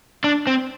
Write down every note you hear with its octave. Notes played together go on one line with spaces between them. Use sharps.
D4
C4